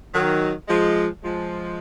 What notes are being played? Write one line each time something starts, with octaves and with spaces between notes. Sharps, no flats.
D#3 F#3
F3 G#3
F3 G#3